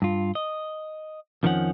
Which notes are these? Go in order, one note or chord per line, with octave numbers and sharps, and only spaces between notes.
G2 F4
D#5
F2 D#3 F3 C#4 F#5